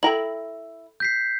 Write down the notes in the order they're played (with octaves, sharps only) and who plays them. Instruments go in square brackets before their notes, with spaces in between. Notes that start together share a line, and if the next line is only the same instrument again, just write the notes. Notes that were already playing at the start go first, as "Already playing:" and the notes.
[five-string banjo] E4 A#5 [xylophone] A4 G5 F#7
[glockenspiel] G6 B6 C7